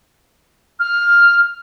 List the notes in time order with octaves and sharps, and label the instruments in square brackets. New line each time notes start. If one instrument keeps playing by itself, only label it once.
[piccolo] F6